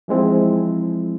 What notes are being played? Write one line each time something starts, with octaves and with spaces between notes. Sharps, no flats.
E3 F3 G#3 C4 E4